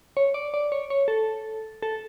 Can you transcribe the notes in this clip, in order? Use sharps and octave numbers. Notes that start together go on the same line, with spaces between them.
C#5
D5
D5
C#5
C#5
A4
A4